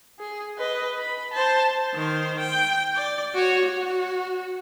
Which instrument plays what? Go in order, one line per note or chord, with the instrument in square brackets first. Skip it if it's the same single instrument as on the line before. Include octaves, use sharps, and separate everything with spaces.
[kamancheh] G#4
B4 D#5
B5
C5 A5
[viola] D#3 C5
G5
D5
F#4 C#5
F#4